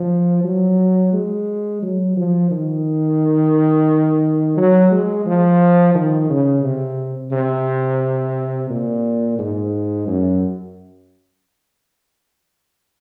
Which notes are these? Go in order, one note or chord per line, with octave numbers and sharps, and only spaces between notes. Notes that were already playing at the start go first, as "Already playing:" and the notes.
Already playing: F3
F#3
G#3
F#3
F3
D#3
F#3
G#3
F3
D#3
C#3
C3
C3
A#2
G#2
F#2